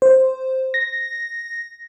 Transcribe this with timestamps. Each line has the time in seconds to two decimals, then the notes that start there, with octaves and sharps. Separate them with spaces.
0.02 C5
0.74 A#6